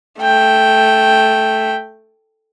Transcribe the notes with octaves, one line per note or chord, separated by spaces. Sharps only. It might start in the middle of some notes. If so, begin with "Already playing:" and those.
A3 G5